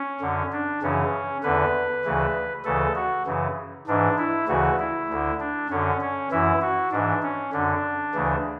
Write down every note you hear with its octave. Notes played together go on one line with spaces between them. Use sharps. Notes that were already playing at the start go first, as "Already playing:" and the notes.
Already playing: C#4
F#2 D3
D4
F#2 C#3 E3 C#4
E2 D3 B4
D2 C#3 E3
D2 C#3 E3 A4
F#4
F#2 C#3 E3
G#2 E3 D4
E4
D2 C#3 E3 F#4
E4
D2 D3
D4
F#2 D3 C#4
C#4
F#2 E3 E4
F#4
G#2 E3 D4
C#4
F#2 D3 D4
D2 C#3 E3